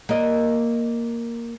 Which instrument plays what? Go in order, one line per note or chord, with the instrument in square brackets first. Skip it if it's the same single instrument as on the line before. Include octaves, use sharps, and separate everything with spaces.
[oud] A#3 D#5